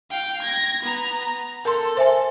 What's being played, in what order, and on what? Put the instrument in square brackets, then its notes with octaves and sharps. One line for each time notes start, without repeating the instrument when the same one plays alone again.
[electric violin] F5 G5
G#6 A#6
B3 A#5
[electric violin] A4 [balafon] A#4 C6
[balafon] C5 E5 G#5